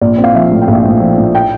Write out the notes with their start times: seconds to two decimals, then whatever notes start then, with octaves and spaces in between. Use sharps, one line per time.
0.01 A#1 D5
0.18 C4
0.24 F5
0.35 F3 E5
0.51 A2
0.61 G5
0.68 A#1 F5
0.85 A2
1.01 F3
1.18 A2
1.35 G5